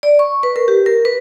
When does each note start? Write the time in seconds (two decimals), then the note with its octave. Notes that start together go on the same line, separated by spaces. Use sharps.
0.03 D5
0.19 C#6
0.43 B4
0.56 A#4
0.68 G4
0.86 A#4
1.05 B4